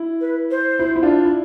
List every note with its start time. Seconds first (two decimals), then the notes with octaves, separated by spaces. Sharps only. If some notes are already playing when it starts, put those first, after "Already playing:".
Already playing: E4
0.20 B4
0.50 C5
0.79 E4
0.96 E4
1.03 D4 F4
1.25 E4